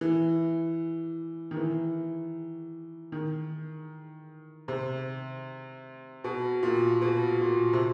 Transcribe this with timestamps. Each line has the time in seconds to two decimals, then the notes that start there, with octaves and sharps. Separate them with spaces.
0.01 E3
1.51 D#3
1.57 E3
3.12 D#3
4.68 C3
6.24 B2
6.63 A#2
7.01 B2
7.41 A#2
7.73 C3